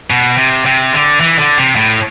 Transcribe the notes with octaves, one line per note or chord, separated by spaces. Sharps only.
B2
C3
C3
D3
E3
D3
C3
A2